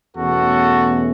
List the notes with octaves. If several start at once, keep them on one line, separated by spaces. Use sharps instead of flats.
E2 B2 A3 C#4 F#4 A4